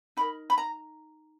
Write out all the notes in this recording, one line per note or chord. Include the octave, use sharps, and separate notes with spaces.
D#4 A#4 B5
B5
A#5